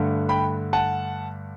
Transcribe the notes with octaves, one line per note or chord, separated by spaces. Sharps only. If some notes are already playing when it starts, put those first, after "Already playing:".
Already playing: G2 D3 A3
G5 B5
F#5 A5